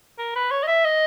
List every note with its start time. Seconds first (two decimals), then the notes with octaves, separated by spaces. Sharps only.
0.18 A#4
0.36 B4
0.51 C#5
0.63 D#5
0.68 E5
0.85 D#5